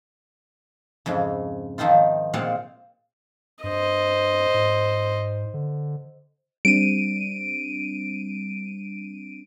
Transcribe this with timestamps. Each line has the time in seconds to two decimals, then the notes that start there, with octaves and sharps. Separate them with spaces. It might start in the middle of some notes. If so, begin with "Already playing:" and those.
1.06 F2 G#2 C#3
1.78 D#3 F3 C4 D#4 F4
2.34 A#2 G#3 C4 D5 F5 F#5
3.64 G2 C5 D#5
4.54 G#2
5.54 D3
6.65 G3 C4 D4 D7 D#7